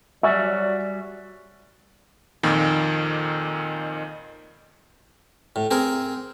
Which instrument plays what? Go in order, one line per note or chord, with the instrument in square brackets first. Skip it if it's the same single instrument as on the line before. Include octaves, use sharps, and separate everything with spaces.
[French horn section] F#3 D5 [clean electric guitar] G3 F#4 [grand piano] E5 [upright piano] G#5 C#6 E6
[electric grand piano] F2 A#2 D#3
[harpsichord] A2
C4 G#4 A#4